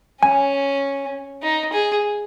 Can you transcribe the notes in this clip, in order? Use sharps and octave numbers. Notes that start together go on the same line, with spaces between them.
C#4 G#5
D#4
G#4